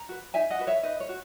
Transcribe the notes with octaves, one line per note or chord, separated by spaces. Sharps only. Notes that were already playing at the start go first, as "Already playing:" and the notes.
Already playing: A#5
F#4 B4
D#4 E5 G#5
D#5 F#5
F#4 B4
C#5 E5
D#4 B4 D#5
C#5
F#4